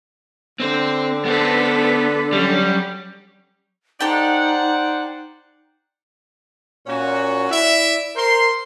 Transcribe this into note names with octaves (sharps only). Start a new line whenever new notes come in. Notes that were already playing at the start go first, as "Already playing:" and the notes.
D3 C4 C5
B3 A4 B4 C5
F#3 G3 C#4
D#4 G4 A4 C5 D5 F#5 G5
A#2 C#4 F#4
E4 D5 E5
A#4 C5 C6